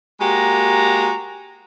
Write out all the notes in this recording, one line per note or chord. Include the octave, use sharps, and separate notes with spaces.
G#3 A#3 F#4 G4 A#5